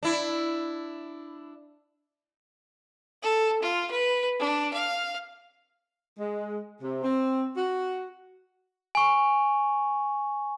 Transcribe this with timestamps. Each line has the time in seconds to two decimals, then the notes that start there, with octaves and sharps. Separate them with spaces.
0.03 D4 E4
3.23 A4
3.63 F4
3.91 B4
4.40 D4
4.73 F5
6.19 G#3
6.82 C3
7.03 C4
7.57 F#4
8.95 G#5 C#6